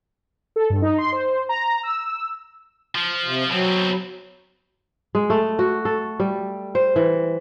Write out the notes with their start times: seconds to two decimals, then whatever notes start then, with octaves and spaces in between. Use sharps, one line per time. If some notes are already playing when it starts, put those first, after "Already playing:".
0.56 A4
0.70 G2
0.82 D#4
0.98 C6
1.12 C5
1.49 A#5
1.83 E6
2.95 F3
3.25 C3
3.50 B2 F#3 C4
5.15 G#3
5.30 A3
5.59 F#4
5.85 A4
6.20 G3
6.75 C5
6.96 E3